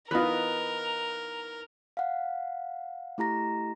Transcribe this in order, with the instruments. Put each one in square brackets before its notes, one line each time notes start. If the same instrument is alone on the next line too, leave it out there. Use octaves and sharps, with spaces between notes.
[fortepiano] E3 B3 F4 [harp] D#4 B4 [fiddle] A#4
[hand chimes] F5 F#5
A3 E4 G4 A#5 A#6